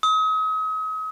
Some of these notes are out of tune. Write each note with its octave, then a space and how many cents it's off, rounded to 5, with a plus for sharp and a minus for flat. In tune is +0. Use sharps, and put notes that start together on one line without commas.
D#6 +40